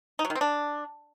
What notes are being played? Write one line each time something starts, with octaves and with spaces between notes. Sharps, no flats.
D#4
F#3
D#3
C4
D4